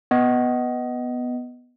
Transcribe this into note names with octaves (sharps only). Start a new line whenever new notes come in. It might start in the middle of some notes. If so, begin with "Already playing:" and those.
B3 D#5